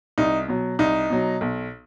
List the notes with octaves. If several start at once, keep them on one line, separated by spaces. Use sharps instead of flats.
C2 D#4
B2 F#3
C2 D#4
B2 F#3
B1